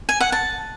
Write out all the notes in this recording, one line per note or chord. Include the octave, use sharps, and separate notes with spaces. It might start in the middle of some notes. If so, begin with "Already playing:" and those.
G#5
F#5
A5